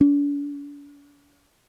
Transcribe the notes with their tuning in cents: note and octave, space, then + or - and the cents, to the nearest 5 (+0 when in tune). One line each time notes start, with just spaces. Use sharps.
D4 -40